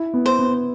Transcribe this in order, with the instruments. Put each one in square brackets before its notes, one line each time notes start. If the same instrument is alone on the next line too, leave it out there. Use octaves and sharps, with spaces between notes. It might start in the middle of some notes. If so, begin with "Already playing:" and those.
Already playing: [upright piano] E4
B3
[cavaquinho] C5
[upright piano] B3